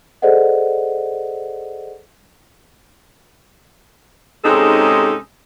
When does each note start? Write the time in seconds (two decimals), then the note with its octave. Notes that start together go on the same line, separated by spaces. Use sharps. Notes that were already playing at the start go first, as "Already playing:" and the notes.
0.22 G#4 A4 C5 D5 D#5 F#5
4.45 G#2 C3 G#3 C#4 D#4 A4